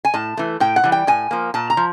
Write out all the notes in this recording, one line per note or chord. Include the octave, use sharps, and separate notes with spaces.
G#5
A2 A5
E3 A3
A2 G5
F#5
E3 G3
G5
A2 G#5
F3 A#3
A#2 A5
A#5
F3